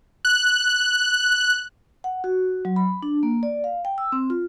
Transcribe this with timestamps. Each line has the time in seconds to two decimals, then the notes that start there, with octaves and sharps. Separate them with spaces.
0.25 F#6
2.04 F#5
2.24 F#4
2.65 F#3
2.76 B5
3.03 D4
3.23 A#3
3.43 D5
3.64 F5
3.85 G5
3.98 E6
4.12 C4
4.30 F4